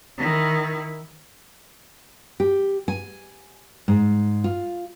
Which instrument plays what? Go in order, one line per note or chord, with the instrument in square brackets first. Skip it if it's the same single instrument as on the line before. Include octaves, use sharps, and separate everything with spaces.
[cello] D#3 E4
[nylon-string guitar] G4
G#5
G#2
F4